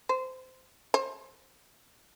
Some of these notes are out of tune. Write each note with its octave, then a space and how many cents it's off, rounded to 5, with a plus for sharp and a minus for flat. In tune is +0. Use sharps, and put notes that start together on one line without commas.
C5 -20
C5 +20